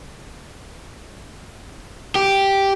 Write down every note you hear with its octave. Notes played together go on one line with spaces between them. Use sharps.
G4